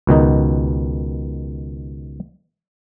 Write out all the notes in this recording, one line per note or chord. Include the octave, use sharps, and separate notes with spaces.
C#2 B2 D#3 D#4